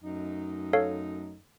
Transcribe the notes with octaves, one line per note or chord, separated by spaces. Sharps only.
F#2 A3 D#4
A4 C#5 F5